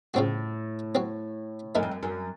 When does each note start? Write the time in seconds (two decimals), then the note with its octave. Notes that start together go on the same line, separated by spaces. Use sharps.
0.14 A2 C#3 F3 C4 F#4
0.95 F#3 C4 F#4
1.75 F#2 A3 D#4 A#4
1.83 F2
1.91 F#2
2.03 F#2